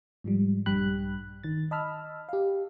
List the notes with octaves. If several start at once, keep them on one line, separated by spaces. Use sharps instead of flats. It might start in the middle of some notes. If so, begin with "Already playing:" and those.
G#2 F3 G3
A#1 G2 G3 G5 B5 F#6
D#3 A6
D#5 A5 B5 E6 F6
G4 F5